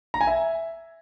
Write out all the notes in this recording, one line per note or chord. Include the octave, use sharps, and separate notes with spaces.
A#5
G#5
E5